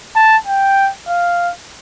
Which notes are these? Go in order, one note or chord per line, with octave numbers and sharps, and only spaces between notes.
A5
G5
F5